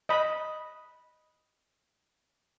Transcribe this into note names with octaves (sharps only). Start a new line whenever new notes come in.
D#5 B5